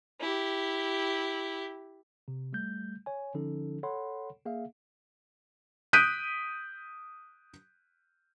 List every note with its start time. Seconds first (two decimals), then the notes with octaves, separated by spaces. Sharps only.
0.21 E4 G4
2.28 C3
2.53 G3 A3 G6
3.06 C#5 G#5
3.34 D3 F3 C#4 D#4 A4
3.83 A4 C#5 F#5 B5 C6
4.45 A#3 G#4 E5 F5
5.93 D#6 F#6 G6 B6 D7 D#7